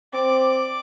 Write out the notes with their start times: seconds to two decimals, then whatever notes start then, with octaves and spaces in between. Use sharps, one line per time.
0.13 C4 D5 D6